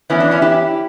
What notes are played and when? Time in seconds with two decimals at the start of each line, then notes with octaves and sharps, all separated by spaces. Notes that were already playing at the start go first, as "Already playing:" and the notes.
0.10 F#2 E3 B3 C#4 E4
0.20 D4
0.31 C#4 E4
0.42 E4 G4